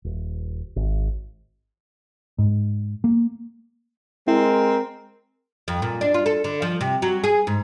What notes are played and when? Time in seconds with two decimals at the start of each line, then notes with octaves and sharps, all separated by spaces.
0.04 D#1
0.76 G#1
2.38 G#2
3.04 A#3
4.28 G#3 C4 E4 A#4
5.68 F2
5.82 A#2
6.01 D4
6.14 F4
6.26 A4
6.44 D3
6.62 F3
6.81 C3
7.02 F#3
7.24 G#4
7.47 G#2